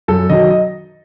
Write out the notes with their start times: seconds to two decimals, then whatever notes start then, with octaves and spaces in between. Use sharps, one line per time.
0.08 F#2 A4
0.30 D#3 F#3 D#5
0.50 D#5